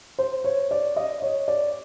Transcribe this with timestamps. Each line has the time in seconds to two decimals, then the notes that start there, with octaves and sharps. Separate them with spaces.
0.19 C5
0.44 C#5
0.71 D5
0.96 D#5
1.22 C#5
1.48 D5